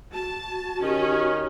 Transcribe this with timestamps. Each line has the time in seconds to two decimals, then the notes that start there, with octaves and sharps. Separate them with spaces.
0.14 F#4 A5
0.83 D#3 C#4 G4